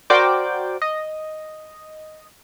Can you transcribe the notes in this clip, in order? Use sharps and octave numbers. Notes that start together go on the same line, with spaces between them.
F#4 A#4 C5 D5 G5 D6
D#5